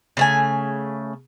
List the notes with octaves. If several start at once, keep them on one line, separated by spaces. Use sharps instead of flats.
C#3 A3 G#5